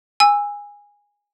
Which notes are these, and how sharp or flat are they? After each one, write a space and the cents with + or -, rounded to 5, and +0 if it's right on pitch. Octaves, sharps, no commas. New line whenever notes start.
G#5 -15 E6 +0